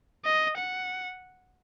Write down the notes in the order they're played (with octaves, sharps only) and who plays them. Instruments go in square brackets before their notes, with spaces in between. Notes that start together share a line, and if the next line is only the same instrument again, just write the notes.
[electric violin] D#5
F#5